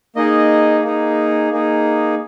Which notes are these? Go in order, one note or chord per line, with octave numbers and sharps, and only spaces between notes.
A#3 D#4 G#4 D#5
A#3 D#4 G#4
A#3 D#4 G#4